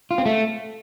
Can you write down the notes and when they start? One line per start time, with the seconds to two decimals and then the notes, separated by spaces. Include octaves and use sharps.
0.11 F4
0.18 C4
0.26 A3